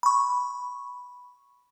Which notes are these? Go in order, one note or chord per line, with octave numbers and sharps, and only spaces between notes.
B5 C#6